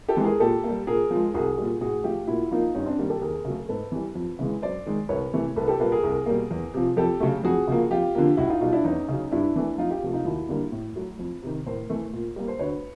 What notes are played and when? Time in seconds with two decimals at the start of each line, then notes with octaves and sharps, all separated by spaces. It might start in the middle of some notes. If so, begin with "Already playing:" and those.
0.08 G4 A4
0.17 E3 G#3
0.24 G#4 A#4
0.40 A#2 G4 A4
0.64 G3 A#3
0.87 A#2 G#4 A#4
1.11 F3 G#3
1.34 C2 F#4 G#4
1.58 A#2 G3
1.81 A2 F#4 G#4
2.04 F3 A3 F4 G4
2.27 A#2 E4 F#4
2.51 F3 A#3 D#4 F4
2.75 G2 C#4 D#4
2.86 C4 D4
2.98 D#3 G3 A#3
3.10 G4 A4
3.21 D#2 G#4 A#4
3.45 C#3 F#3 A3
3.69 G#2 A4 B4
3.92 E3 G3
4.15 F2
4.39 C#3 E3 G#3
4.62 F#2 C5 D5
4.86 D#3 G#3
5.09 C2 B4 C#5
5.33 C3 E3 A3
5.56 C2 A4 B4
5.68 G4 A4
5.80 A#2 G3 A#3 A4 B4
5.92 G#4 A#4
6.04 C2
6.26 B2 G3 A#3
6.51 E2
6.74 C3 F3
6.97 F2 G4 A4
7.20 C#3 F#3 A3
7.43 F2 F#4 G#4
7.68 C#3 F3 A#3
7.90 F2 F4 G4
8.15 D3 F3 A#3
8.37 C#2 E4 F#4
8.50 D#4 F4
8.61 B2 G3 D#4 F4
8.72 D4 E4
8.85 E2 C#4 D#4
9.08 C#3 F#3
9.31 G2 D4 E4
9.56 E3 A3
9.78 F2 D#4 F4
9.90 F4 G4
10.02 C3 F3 A3
10.13 D#4 F4
10.25 D#2 E4 F#4
10.49 D3 G3 A#3
10.72 A2
10.96 F#3 A3
11.19 F2
11.43 C3 D#3
11.66 A2 A#4 C5
11.90 E3 A3
12.13 A#2
12.36 G3 A#3
12.48 C5
12.59 D2 B4 C#5